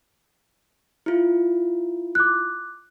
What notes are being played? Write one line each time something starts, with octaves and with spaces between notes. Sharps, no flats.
E4 F4
D6 F#6